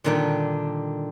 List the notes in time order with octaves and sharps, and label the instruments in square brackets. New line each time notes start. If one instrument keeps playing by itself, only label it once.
[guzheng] A#2 D3 D#3 G3 D4